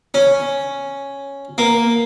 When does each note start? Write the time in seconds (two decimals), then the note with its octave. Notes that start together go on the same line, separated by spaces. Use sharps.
0.14 C#4
1.58 A#3